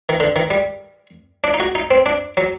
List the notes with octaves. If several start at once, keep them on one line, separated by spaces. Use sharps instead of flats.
D#3
D3
D#3
G3
D4
D#4
F#4
D#4
C4
D4
F#3